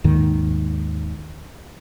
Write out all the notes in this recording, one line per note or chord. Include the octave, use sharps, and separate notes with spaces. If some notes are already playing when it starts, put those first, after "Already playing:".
D#2 G#2 D#3